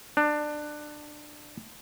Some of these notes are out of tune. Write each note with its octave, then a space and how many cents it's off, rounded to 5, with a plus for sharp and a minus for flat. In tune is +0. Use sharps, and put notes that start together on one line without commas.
D4 +20